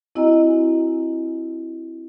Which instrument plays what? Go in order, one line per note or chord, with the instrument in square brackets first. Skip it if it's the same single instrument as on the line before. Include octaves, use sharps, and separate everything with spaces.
[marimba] C4 E4 F#4 D#5 G#5 A#5